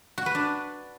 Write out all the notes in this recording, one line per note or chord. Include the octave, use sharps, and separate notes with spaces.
F#4
B4
D4